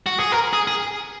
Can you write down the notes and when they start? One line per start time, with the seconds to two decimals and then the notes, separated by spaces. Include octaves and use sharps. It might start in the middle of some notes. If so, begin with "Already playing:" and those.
0.06 F#4
0.19 G#4
0.32 A#4
0.53 G#4
0.68 G#4